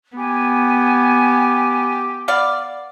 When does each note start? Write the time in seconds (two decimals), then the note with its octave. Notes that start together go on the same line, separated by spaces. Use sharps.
0.17 B3 G4 G#5
2.28 B3 D5 F5